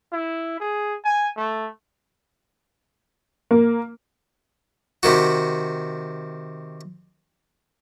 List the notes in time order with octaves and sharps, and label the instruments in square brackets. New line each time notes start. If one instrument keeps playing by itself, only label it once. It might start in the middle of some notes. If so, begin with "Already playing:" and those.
[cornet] E4
G#4
G#5
A3
[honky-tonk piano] A#3
[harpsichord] C3 D#3 F#4